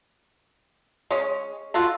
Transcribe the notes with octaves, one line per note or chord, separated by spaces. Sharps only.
G#3 C#4
F4 F#4 A4